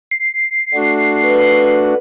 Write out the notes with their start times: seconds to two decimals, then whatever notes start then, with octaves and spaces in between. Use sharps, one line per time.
0.11 C7
0.74 A3 D4 F#4
1.24 B4